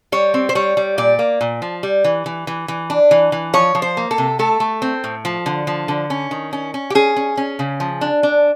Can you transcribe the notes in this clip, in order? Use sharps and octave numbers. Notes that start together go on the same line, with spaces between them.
G3 C#5
C4
C5
G3 C#5
G3
A#2 D5
A#3
A#2
F3
G3
E3
E3
E3
E3
D4
E3
E3
F3 C#5
F3
C5
A#3
A4
C3
A3 A4
A3
C4
A2
F3
D3
F3
D3
C#4
D#3
C#4
C#4
G4
C#4 G#4
C#4
C#4
C#3
F3
D4
D4